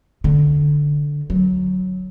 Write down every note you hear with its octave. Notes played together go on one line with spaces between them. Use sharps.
D3
F#3